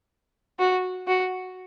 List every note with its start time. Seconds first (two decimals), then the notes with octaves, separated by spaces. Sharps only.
0.59 F#4
1.07 F#4